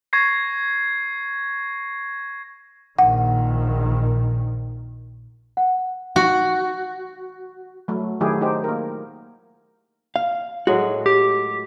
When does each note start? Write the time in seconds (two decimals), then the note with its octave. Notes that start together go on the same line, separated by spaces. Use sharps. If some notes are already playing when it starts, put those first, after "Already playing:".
0.13 C#6 G#6 A#6 C7
2.99 A#1 D#3 F#5
5.57 F#5
6.16 F#4
7.88 F#3 A3
8.20 D#3 F#3 A3 E4 G4 G#4
8.41 D#4 G4 C5
8.64 A#3 A#4
10.16 F5
10.67 A2 F#3 G#3 F#4
11.06 G4